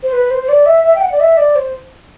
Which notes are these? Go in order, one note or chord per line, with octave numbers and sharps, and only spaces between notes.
C5
B4
C5
C5
D5
E5
E5
G5
F#5
D5
E5
D5
C5